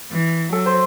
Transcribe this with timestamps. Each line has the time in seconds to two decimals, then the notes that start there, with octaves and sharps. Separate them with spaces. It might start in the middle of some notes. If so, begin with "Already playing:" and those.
0.12 E3
0.53 F#3 A4
0.66 C5